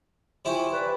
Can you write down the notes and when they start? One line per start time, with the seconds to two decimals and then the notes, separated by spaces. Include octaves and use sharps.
0.45 F3 E4 G4 G#5 C#6
0.71 B4 D5